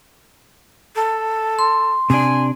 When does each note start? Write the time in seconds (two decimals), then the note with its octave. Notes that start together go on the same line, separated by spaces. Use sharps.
0.96 A4
1.59 C6
2.10 C3 D4 G#5